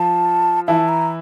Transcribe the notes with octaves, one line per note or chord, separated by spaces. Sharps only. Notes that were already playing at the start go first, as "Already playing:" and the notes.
Already playing: F3 F4 A5
E3 E4 A5
A#5